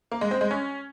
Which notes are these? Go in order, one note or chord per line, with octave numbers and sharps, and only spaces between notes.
A#3
G#3
C4
G#3
C#4